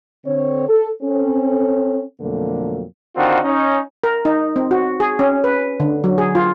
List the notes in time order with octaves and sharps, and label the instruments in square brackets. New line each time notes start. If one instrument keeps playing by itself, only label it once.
[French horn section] D3 C4 C#5
A4
C4 C#4 A4
F2 B2 D3 F#3 A3 A#3
[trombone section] D3 D#3 C4 D#4 F4 F#4
C#4 D#4
[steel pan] A#4
D#4
C4
F#4
G#4
C#4
B4
D3
F#3
G#4
F4